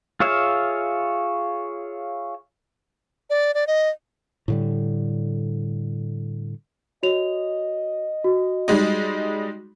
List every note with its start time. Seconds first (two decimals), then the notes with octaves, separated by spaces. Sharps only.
0.20 F4 G#4 C#5 E5 F5
3.30 D5
3.54 D5
3.67 D#5
4.48 A2 D3 G3
7.03 F#4 C#5 D#5 F7
8.24 F#4
8.68 G3 G#3 D#4